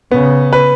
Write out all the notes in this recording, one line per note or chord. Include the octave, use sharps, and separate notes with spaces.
C#3 B3
B4